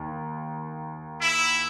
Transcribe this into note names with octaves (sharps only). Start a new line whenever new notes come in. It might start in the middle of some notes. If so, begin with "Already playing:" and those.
Already playing: D#2
E4